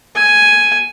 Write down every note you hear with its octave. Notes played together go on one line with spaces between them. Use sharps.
G#5